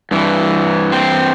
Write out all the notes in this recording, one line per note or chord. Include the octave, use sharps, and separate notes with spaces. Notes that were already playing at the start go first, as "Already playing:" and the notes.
G2 E3
C4